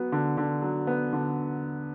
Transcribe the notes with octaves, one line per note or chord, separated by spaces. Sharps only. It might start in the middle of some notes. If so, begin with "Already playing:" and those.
Already playing: F#3 B3
D3
D3
F#3
B3
D3